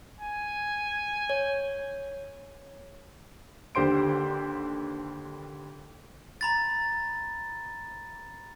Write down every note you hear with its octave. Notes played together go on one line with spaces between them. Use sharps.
G#5
C#5
D#2 D3 G4 C5 C6 D7
A#5 B5 A6